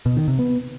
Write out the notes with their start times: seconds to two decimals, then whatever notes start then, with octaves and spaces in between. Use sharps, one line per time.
0.06 B2
0.17 D#3
0.28 C3
0.39 B3